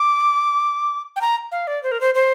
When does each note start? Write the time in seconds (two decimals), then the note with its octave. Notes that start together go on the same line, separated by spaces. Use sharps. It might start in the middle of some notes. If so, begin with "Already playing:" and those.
Already playing: D6
1.16 G5
1.21 A#5
1.52 F5
1.67 D5
1.83 C5
1.92 A#4
2.01 C5
2.15 C5